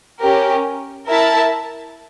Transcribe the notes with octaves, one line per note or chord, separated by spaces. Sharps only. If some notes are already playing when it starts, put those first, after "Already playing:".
C#4 G4 A#4
E4 A#4 E5 A5